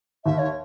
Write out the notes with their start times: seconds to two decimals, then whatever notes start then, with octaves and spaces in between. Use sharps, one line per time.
0.25 D#2 E5
0.39 C#5